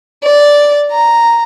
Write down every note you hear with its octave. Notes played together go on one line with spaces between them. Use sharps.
D5
A#5